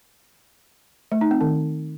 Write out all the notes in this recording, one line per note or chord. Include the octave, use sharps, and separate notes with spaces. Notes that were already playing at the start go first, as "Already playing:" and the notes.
A3
D#4
C4
D#3